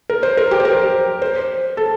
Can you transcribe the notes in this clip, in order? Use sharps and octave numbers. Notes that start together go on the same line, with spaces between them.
A#4
C5
A#4
G4
C5
A#4
C5
A4